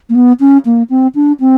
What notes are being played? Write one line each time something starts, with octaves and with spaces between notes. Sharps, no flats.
A#3
B3
C#4
A#3
C4
D4
C4